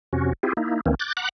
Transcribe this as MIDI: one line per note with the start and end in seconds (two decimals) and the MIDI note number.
0.13 0.33 41
0.13 0.33 48
0.13 0.33 61
0.13 0.33 66
0.43 0.53 60
0.43 0.53 64
0.43 0.53 65
0.43 0.53 67
0.43 0.53 68
0.57 0.81 58
0.57 0.81 63
0.57 0.81 64
0.86 0.95 38
0.86 0.95 51
0.86 0.95 52
0.86 0.95 58
0.86 0.95 60
0.86 0.95 61
0.99 1.13 86
0.99 1.13 90
0.99 1.13 91
0.99 1.13 93
1.17 1.29 78
1.17 1.29 82
1.17 1.29 83
1.17 1.29 86
1.17 1.29 90